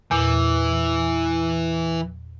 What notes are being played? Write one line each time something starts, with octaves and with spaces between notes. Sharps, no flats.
E2 A#2 E3